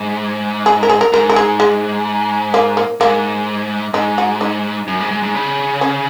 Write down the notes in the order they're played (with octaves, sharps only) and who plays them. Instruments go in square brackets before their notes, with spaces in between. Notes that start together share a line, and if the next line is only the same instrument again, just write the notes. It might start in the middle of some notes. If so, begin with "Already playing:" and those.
Already playing: [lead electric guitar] G#2
[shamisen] G#4
A#4
G#4
A#4
[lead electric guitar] G#2 [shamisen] A#4
[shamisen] A#4
G#4
G#3
A#3
A#3
[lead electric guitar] G#2 [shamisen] A#3
[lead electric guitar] G#2 [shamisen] D#4
[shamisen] F#4
D#4
[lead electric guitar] F#2
G#2
G#2
G#2
C#3
[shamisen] C#4